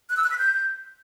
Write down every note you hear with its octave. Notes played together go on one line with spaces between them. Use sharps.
F#6
E6
F#6
B6
G6